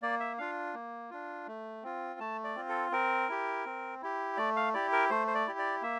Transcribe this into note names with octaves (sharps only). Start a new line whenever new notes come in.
A#3 D5
E5
D4 F4 F5
A#3
D4 F4
A3
C4 F4
A3 A5
D5
C4 F4
A4
C4 A#4
E4 G4
C4
E4 G4
A3 D5
F5
E4 G4 D5
A#4
A3 C5
C5
D5
E4 G4
D5
A#3 E5